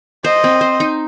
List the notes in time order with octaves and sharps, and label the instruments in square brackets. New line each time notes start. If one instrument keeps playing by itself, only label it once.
[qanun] C5 [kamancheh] D#5
[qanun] C4
C5
D#4